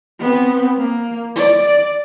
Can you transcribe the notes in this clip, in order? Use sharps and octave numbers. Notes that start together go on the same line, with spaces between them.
B3 C4
A#3
D5